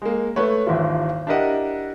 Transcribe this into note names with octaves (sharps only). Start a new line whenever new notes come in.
G#3 A#3
A3 B4 C#5
D#1 G#1 E2 E4 F4
D4 E4 G4 A#4 D#5 F#5